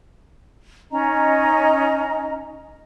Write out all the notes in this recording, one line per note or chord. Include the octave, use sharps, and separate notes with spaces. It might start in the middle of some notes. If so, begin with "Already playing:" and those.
C#4 D#4 D#5 A#5